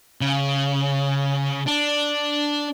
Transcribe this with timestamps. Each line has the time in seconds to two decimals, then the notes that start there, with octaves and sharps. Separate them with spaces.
0.21 C#3
1.68 D4